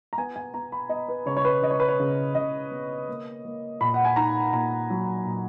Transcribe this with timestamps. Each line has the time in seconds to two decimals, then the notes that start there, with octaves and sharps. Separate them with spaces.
0.13 A#5
0.17 B3 G#5
0.36 G#5
0.54 B3 A#5
0.72 B5
0.89 B3 D#5
1.09 B4
1.26 C#3 C#5
1.37 C#5
1.45 B4
1.62 C#3 D#5
1.71 C#5
1.80 B4
1.88 C#5
2.00 C#3
2.35 C#3 D#5
2.71 B3
3.09 A#3
3.45 A#3
3.81 A#2 B5
3.94 F#5
4.05 G#5
4.16 D#4 A#5
4.53 A#2 A#5
4.90 F#3
5.25 A#2